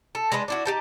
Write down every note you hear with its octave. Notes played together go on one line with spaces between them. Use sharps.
A4
G#3 D4 B4 D#5
D4 E4 F#4
D#4 G4 A5